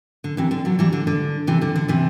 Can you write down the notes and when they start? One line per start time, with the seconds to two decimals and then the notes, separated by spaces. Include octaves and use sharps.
0.24 D3
0.37 C3 E3
0.51 D3
0.65 D3 F#3
0.79 E3 G3
0.93 D3
1.07 D3
1.47 C3 E3
1.62 D3
1.76 D3
1.88 C3 E3